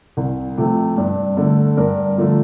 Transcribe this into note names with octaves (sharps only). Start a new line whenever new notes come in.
C2
C3 F3 A3
G2
D3 A3
G2 A#4
D3 F3 A3